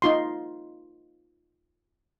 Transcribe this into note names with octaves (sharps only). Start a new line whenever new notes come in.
D#4 F4 C6